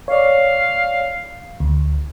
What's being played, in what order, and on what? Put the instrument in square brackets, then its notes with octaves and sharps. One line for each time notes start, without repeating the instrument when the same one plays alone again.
[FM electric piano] C#5 D5 [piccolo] F5
[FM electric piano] D2